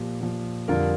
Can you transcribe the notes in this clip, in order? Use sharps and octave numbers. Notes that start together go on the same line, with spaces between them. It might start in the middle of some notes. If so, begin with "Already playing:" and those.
Already playing: A#2 F3 G4
A#2 F3
F2 D3 G3 F4 A#4